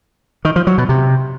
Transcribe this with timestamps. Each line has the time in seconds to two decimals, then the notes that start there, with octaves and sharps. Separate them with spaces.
0.45 D#3
0.56 F3
0.67 F#3
0.78 B2
0.89 C3